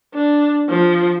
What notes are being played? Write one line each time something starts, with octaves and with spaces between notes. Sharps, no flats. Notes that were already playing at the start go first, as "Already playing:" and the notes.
D4
F3